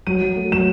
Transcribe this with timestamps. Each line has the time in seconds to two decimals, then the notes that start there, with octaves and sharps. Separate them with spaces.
0.07 F#3 D#7
0.22 F#3
0.36 A3
0.52 F#3 E7